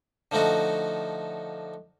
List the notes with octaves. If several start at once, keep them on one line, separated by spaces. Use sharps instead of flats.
D3 F3 A3 D#4 F#4